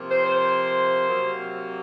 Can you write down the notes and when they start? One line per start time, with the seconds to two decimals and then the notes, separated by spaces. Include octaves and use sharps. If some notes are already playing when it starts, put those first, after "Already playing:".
Already playing: C3 F3 A#3
0.10 C5
0.26 C5
1.09 C3 F#3 A#3